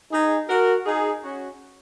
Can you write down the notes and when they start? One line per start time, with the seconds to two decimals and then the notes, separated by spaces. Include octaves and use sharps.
0.12 D#4 G#4
0.49 F#4 A#4
0.86 D#4 G#4
1.23 C#4 F#4